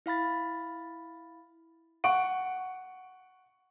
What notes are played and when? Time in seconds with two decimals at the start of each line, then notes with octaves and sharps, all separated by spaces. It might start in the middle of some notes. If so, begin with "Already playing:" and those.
0.06 E4 F5 B5 A6
2.04 F#5 C#6 D7